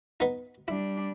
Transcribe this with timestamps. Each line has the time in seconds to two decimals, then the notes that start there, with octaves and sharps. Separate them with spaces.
0.20 B3 D#4
0.68 G3 D4 E4